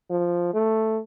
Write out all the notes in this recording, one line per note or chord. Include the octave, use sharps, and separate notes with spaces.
F3
A3